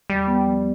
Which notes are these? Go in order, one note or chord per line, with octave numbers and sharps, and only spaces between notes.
E2 G3
B3
F3